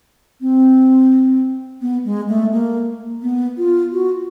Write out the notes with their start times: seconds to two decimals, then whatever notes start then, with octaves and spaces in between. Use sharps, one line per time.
0.41 C4
1.81 B3
2.05 G#3
2.28 A3
2.52 A#3
3.22 B3
3.57 F4
3.93 F#4